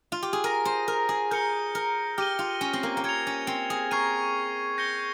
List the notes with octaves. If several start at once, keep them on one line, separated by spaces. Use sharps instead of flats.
F4
G4
G#4
A#4 D#6 A#6 D#7
C5
A#4
G#4
A#4 G6 C#7 G7
A#4
G4 F6 A#6 D#7 G7
F4
C#4
C4
A#3
A#3
C4 G#6 C#7 F7
C#4
C4
G#4
A#4 C#6 G#6 C7 D#7
G6 A#6 C#7 G7